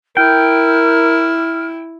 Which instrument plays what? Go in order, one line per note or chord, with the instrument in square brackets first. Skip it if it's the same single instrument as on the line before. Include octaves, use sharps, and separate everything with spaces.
[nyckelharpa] E4 [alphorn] A#4 [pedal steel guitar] G5 [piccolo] F6